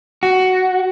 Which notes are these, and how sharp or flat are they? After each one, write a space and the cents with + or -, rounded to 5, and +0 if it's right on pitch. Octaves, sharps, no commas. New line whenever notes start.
F#4 +10